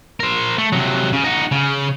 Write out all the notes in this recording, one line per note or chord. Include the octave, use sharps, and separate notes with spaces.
A#4 C5
A3
C3 F#3
C#3
D#4 F#4
C#3